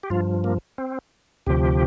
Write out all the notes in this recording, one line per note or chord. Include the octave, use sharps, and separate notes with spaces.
G4
G2 F3 F4
A#3
C4
D2 C3 F3 G4